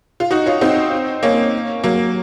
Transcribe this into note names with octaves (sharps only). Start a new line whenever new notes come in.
F4
D#4 F#4
C#4 F4
C4 D#4
A#3 C#4
F#3 A#3